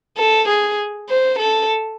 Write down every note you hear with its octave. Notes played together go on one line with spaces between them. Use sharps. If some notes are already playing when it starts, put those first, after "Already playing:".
A4
G#4
C5
A4